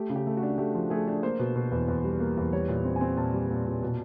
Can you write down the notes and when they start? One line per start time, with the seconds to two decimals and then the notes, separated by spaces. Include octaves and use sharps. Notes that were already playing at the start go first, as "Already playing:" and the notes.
Already playing: A3 G4
0.10 C#3
0.16 G4
0.27 A3
0.37 F#4
0.43 D4
0.58 A3 G4
0.75 F3
0.90 A3 G#4
1.08 D4
1.23 A#3 C5
1.39 B2
1.56 B2
1.71 E2
1.88 E2
2.04 G3
2.20 A#3
2.37 E2
2.53 G3 C#5
2.69 A#2
2.85 C4
2.96 G#5
3.01 C4
3.17 A#2 A5
3.34 G3
3.50 A#2
3.66 A#2
3.83 B2